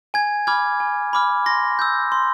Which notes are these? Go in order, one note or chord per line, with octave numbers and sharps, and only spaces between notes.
G#5 G#6
B5 D6 F6 G#6
G#5
B5 D6 F6
C6 A#6
E6 G6
C6